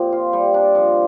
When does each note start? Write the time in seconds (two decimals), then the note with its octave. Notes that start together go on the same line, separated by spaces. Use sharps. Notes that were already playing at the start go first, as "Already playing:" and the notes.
Already playing: A#2 F3 C4 G4
0.12 F4
0.33 G3
0.54 D4
0.75 F3